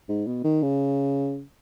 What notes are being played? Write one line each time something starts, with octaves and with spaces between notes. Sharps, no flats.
G#2
B2
D#3
C#3